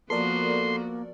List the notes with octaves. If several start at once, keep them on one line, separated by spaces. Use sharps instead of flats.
F3 A#3 B3 F#4 A4 A#4 D5 C6